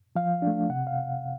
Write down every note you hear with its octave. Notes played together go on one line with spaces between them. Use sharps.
F3 F5
D4
A3
C3 F#5
F5